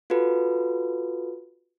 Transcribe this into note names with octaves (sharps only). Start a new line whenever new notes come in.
F4 F#4 A4 B4